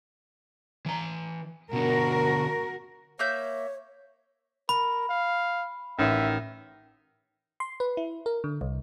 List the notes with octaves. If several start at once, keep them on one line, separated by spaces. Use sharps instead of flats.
E3 A#5
B2 D3 F#4 A#4
A#3 C#5 E5 G6
A#4 B5
F5
A1 D#3 E5
C6
B4
E4
A#4
D3
C2